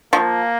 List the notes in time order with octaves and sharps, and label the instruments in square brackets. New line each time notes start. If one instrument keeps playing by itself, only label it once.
[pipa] F3 [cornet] A#3